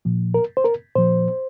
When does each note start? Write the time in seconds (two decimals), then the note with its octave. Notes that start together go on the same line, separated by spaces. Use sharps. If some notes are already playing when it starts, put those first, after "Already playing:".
0.05 A#2 F3
0.34 A#4
0.57 C5
0.64 A#4
0.95 A#2 F3 C5